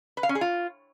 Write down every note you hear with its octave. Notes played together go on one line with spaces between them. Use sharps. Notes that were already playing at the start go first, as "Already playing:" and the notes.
B4
F5
C#4
G#4
F4